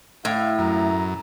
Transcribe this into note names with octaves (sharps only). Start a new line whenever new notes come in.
A2 E4 F5
F#2 A#5